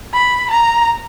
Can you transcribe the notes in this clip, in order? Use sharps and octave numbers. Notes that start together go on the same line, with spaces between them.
B5
A#5